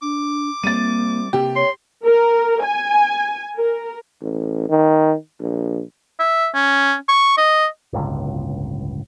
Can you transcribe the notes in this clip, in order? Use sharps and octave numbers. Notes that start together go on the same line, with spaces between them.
D4 D6
G3 A#3 C4 A6 D#7
C3 A#3 G4
C#5 C6
A#4
G#5
A#4
A1
D#3
A#1
E5
C#4
C#6
D#5
D1 G1 C#2